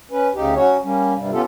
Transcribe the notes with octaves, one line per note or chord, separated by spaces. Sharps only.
C#4 B4
D2 C#3 D#4 G4
F#3 C#4 F#4 C#5
G3 A#3 C#4
G2 C3 G3
B3 C#4 F4 G4 A4